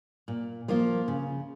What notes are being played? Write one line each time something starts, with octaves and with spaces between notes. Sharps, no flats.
A#2
F3 A#3 F4
C#3